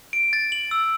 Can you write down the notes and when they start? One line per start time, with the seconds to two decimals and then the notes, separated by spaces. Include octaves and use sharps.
0.13 D7
0.33 A6
0.52 F#7
0.71 E6